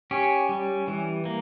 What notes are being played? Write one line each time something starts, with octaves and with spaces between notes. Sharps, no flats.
C#4 G4
G3
E3
A#3